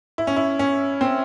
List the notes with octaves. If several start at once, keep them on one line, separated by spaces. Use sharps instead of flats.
E4
C#4
E4
C#4
C4